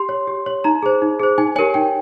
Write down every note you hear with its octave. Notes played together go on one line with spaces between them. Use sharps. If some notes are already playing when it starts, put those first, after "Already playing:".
Already playing: G4 C6
C#5
G4
C#5
D#4 A#5
G#4 C5
D#4
G#4 C5
D#4 G#5
G4 A#4 C#5 G#5
D#4 G5